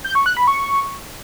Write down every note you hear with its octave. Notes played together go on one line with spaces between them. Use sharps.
G6
C#6
F#6
B5
C#6